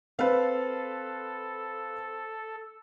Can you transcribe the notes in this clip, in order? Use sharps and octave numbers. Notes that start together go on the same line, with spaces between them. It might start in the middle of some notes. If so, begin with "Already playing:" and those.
C4 A4 B4 F5